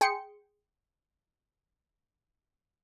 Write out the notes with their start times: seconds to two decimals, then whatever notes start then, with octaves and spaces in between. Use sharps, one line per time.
0.01 G#4 G5 C6 C#7